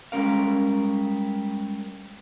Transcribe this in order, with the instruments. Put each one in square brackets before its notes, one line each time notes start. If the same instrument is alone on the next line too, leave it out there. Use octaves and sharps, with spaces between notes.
[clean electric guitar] G3 G#3 C#4 A#4 F5